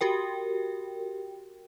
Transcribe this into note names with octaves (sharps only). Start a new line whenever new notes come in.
F#4 G4 A#4 G5